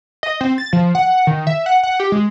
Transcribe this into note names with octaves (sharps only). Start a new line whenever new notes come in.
D#5
C4
A6
F3
F#5
D#3
E5
F#5
F#5
G4
G#3